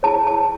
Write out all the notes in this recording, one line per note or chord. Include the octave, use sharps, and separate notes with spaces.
E4 G#4 C#5 A5
A5